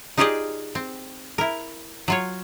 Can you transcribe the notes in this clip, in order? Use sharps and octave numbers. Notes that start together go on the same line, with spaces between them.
D#4 F4 G4 G#4 D5 D#5
C4
E4 A#4
F#3 F4 C#5